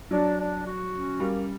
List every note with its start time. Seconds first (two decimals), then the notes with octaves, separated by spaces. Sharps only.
0.11 F#3 D4
0.39 D4
0.65 F#4
0.93 C#4
1.20 G3 A#3